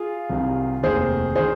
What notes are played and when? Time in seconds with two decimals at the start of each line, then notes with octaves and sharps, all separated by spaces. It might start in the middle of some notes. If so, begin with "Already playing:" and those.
Already playing: F4 G#4
0.30 C2 C3 D#3
0.83 F1 D#2 D#3 G#4 C5
1.35 D#3 G#4 C5